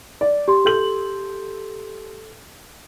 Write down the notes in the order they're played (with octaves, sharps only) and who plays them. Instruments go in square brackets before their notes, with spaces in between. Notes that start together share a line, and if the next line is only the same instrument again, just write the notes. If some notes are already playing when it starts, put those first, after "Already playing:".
[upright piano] D5
[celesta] G4 C6
[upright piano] A4 G6 F#7